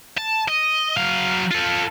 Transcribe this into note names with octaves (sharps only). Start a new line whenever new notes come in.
A5
D#5
F#3 F5
F4 A4